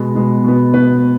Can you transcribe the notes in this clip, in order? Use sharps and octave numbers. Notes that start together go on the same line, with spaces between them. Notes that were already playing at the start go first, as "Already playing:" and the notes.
Already playing: B2 G#3 B3 B4
B2 G#3 B3
B2 B3
B2 B3 B4